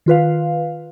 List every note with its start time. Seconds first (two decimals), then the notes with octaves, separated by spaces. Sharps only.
0.06 D#3 F4 B4 F5